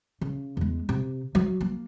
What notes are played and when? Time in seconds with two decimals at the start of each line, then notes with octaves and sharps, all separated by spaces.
0.21 C#3
0.57 E2 G#3
0.89 C3
1.35 F#3
1.61 A#3